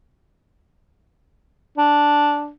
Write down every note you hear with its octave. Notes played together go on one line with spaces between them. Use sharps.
D4